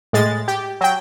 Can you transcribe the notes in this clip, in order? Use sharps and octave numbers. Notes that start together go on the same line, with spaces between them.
A2 G#3 A6
G4
F#3 G5